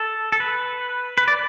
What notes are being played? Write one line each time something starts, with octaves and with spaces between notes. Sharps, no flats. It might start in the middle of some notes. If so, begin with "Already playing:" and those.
Already playing: A4
A4
B4
B4
D5